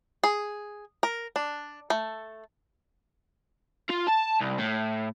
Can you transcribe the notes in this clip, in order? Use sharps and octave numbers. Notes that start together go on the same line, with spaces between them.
G#4
A#4
D4
A3
F4
A5
C2
A2